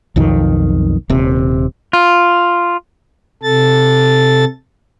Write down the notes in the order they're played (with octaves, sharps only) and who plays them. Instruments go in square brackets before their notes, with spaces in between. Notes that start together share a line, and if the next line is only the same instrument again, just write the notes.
[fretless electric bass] B1 F2 D#3
D#1 C3
[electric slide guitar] F4
[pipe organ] C3 A4 A6